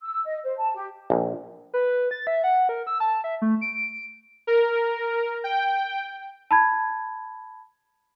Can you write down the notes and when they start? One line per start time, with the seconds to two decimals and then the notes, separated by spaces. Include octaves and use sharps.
0.01 E6
0.26 D#5
0.44 C5
0.59 A5
0.75 G4
1.10 A#1
1.74 B4
2.11 A6
2.27 E5
2.44 F#5
2.69 A#4
2.87 E6
3.00 A5
3.24 E5
3.42 A3
3.61 D7
4.47 A#4
5.44 G5
6.51 A5 B5 G#6